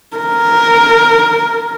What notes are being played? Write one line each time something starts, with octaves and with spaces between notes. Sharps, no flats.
A#4